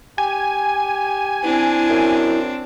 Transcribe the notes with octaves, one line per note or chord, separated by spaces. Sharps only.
G4 G#5
C4 D4 E4
F#2